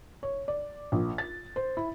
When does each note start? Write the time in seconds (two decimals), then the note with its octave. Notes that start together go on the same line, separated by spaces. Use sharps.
0.23 C#5
0.48 D5
0.92 A#1
1.18 A6
1.56 C5
1.77 E4